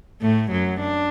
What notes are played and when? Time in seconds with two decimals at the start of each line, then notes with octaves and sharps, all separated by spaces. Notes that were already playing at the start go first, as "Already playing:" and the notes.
0.21 A2 A3
0.51 F#2 F#3
0.81 D4